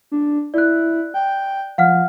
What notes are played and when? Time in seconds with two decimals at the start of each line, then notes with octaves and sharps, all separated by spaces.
0.12 D4
0.54 E4 D5 F#6
1.14 G5
1.78 F3 F5 F#5 F6